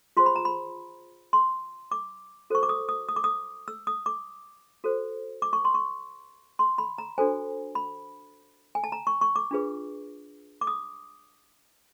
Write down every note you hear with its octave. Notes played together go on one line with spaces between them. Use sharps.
F4 G#4 C5 C6
B5
A#5
B5
C6
D6
F#4 A4 C5 C#6
D6
D#6
D#6
D#6
D6
D#6
E6
D#6
D6
F#4 A4 C5
D6
C#6
C6
C#6
C6
B5
A#5
D4 F#4 A4 C5 G#5
B5
G#5
A5
A#5
C#6
C#6
D6
D4 F4 G#4 B4
D6
D#6